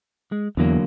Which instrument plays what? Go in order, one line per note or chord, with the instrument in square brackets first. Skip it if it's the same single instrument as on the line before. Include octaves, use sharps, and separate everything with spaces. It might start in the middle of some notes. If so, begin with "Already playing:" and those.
[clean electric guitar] G#3
[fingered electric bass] E2 [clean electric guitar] D3 F#3 A#3